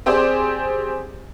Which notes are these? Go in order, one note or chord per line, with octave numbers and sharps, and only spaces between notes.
C4 G4 G#4 C5 D5